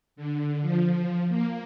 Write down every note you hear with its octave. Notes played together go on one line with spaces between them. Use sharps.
D3
F3
A#3